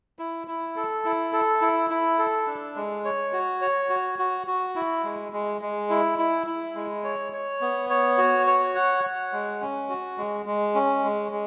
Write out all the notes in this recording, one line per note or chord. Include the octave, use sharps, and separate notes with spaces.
E4
E4
A4
E4
A4
E4
E4
A4
D4
G#3
C#5
F#4
C#5
F#4
F#4
F#4
E4
G#3
G#3
G#3
E4
E4
E4
G#3
C#5
C#5
B3
C#5
F#4
C#5
F#5
F#5
G#3
C#4
F#4
G#3
G#3
C#4
G#3
G#3